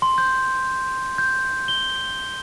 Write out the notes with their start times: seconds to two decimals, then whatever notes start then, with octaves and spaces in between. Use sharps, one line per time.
0.02 C6
0.18 G6
1.18 G6
1.68 G7